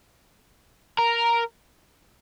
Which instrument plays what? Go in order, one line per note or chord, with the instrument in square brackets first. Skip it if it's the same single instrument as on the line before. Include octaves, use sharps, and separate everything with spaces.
[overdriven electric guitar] A#4